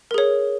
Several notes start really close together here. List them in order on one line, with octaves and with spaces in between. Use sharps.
A#4 G#4 C#5